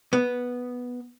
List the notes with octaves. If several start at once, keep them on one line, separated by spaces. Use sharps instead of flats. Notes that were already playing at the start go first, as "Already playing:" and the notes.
B3